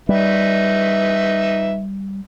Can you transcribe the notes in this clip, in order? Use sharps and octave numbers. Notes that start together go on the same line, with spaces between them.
G3 D#4 B4 E5